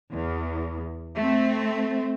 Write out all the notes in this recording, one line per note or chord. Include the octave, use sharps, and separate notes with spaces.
E2
A3 C4